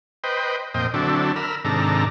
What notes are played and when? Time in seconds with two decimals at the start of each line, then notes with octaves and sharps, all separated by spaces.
0.24 B4 C5 D#5 G5
0.74 F2 A#2 C5 D#5 G5
0.94 D3 F#3 C4 D4 E4 A4
1.36 A#4 B5 E6 F6
1.65 G#2 C3 D#3 D4 A4 A#5